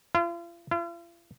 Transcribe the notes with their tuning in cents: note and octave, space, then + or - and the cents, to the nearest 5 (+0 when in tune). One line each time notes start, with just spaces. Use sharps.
F4 -40
F4 -45